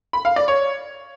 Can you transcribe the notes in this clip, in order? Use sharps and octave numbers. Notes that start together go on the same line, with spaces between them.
B5
F5
D5
C#5